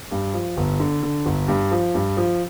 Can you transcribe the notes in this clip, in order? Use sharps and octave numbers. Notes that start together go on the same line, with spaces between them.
G2
F3
G1
D3
D3
G1
G2
F3
G2
F3